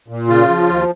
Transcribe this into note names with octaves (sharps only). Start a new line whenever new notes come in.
A#2
C#3 F4
F3
D#2